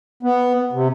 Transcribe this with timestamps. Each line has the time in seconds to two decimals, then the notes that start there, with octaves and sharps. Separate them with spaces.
0.23 B3
0.73 C3